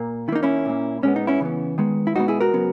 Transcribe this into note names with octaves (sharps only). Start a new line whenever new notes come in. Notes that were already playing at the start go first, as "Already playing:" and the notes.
Already playing: A#2 A#3
D#3 A#3 D#4 E4
C#4 E4
A#2 A#3
A#2 G#3 B3 C#4
D#4
C#4 E4
C#3 E3 B3
D#3 G#3 B3
E4
B2 G#3 B3 D#4 F#4
E4 G#4
F#4 A#4
C#3 F#3 B3